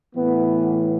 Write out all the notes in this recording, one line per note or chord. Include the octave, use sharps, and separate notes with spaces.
A2 E3 B3